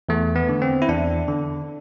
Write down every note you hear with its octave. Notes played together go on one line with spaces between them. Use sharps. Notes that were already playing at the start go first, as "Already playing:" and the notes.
E2 A3
B3
D3
C4
E4
E2 D4
D3